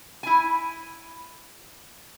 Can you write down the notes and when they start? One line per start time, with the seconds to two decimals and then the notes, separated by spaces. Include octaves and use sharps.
0.23 E4 G#5